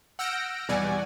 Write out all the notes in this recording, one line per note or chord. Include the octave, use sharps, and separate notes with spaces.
F#5 E6 F6 G6 A#6 D7
E2 B2 G3 D5 F#5 G#5